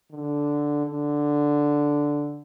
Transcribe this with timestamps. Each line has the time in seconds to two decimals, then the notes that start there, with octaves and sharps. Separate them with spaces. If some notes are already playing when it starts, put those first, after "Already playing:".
0.11 D3
0.86 D3